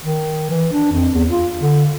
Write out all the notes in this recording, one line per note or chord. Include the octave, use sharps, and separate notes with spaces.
D#3
E3
D4
F2
E2
F4
D3